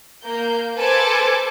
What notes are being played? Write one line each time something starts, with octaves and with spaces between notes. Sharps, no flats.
A#3 G6
A4 B4 C5 G#5 A5 D6